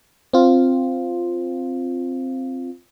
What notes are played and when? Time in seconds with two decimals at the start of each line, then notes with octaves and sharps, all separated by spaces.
0.33 C4 F4